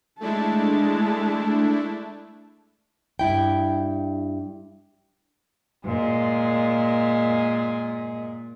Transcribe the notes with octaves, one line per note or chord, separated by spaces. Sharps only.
G#3 A3 D4 E4 A5
G2 E4 G5
A#2 G#3